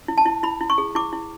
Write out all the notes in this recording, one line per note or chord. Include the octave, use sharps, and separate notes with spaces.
E4
A5
E4
E4 B5
E4
C#6
G#4
E4 D6
E4